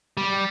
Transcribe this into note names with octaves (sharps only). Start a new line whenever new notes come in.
G3